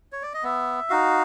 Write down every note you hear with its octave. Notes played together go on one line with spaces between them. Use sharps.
C#5
D5
D#5
B3 E5
D#4 F#4 F5